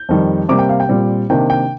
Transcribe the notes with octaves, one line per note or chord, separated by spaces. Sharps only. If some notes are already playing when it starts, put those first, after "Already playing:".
Already playing: G6
F2 D#3 G3
C3 G3 A#3 D6
G5
F5
G5
A#2 G3 C4
C3 D#3 A#3 D4 G5
G5